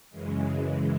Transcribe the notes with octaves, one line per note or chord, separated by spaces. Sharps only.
F#2 C#3 E3 G#3